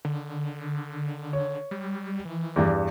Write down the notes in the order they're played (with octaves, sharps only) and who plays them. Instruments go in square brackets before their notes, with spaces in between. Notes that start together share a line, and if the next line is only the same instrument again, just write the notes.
[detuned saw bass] D3
[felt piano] C#5
[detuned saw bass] G3
E3
[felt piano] E2 G2